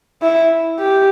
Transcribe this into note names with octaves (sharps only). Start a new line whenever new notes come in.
E4
G4